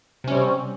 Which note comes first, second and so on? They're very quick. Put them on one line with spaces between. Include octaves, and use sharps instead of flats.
C3 C#4 G3 C4